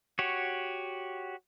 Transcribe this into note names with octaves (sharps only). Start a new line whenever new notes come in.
F#4 G4 C#5